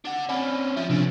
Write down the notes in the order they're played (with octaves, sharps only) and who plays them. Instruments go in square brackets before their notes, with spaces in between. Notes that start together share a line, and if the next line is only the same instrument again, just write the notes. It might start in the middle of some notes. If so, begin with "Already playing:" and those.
[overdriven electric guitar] D4 F#5
[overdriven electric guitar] C4 C#4 [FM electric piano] D5 G#5 B5
[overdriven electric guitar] F3 F4 [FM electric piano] E5
[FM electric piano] C3 F3 D4 [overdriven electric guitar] E3 A3